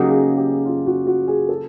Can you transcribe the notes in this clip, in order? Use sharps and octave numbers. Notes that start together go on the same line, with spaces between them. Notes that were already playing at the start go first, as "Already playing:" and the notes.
Already playing: C#3 F#3 A#3 D#4 G4
G#4
G4
F4
F#4
F#4
G#4
A4